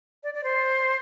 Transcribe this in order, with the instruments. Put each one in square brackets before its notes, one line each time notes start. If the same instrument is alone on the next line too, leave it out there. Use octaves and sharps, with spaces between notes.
[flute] D5
D5
C5